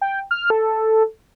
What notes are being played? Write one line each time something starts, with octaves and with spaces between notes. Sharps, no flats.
G5
F6
A4